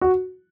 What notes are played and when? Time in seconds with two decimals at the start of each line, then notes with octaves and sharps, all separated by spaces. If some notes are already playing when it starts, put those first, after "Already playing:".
0.02 F#4